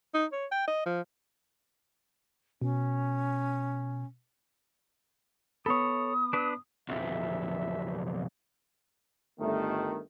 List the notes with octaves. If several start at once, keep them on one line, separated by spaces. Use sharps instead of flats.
D#4
C#5
G5
D#5
F3
B2 C#4
B3 A4 C#5 B5 D#6
D4 B4
B1 F2 B2 E5
G1 D#3 A3